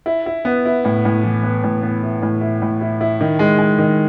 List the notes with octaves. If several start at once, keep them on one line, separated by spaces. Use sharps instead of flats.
E4
E4
B3
E4
A2
A2
E3
B3
A2
B3
E4
A2
E4
A2
E4
E4
D#3
G#3
G#3
D#3